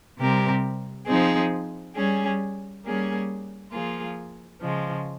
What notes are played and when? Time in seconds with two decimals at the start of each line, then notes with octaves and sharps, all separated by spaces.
0.18 C3 G3 C4 G4 A#4
1.07 F3 C4 D#4 G#4
1.95 G3 C#4 G#4
2.84 G3 A#3 C#4 G#4
3.72 F3 A#3 F4 G#4
4.61 C#3 F3 G#3